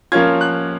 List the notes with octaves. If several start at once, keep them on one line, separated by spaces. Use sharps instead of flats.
F3 A#3 C#4 F4 G#6
F#6